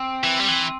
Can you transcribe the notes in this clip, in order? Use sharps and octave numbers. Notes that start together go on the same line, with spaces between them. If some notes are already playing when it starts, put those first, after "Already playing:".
Already playing: C4
E3
G3
E3